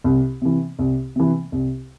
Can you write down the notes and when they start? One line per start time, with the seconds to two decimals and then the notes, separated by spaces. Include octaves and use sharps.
0.04 C2
0.42 C3 E3
0.79 C2
1.16 C3 E3
1.52 C2